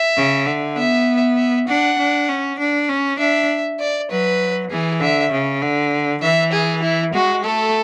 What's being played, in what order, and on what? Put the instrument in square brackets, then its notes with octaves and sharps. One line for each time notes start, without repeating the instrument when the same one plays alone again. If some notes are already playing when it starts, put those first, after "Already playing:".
Already playing: [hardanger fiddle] E5
[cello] C#3
D3
[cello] B3 [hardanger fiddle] E5
[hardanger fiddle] E5
[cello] D4 [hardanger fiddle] F#5
[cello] D4
C#4
D4
C#4
[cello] D4 [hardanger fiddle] E5
[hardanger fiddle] D5
[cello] F#3 [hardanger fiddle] B4
[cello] E3 [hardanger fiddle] G#4
[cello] D3 [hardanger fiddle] E5
[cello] C#3
D3
[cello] E3 [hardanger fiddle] E5
[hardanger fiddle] G#4
E4
[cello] G#3 [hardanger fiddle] F#4
[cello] A3 [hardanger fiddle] A4